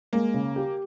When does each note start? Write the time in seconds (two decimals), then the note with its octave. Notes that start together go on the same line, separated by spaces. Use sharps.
0.13 G#3 A#3
0.34 C#3
0.56 G4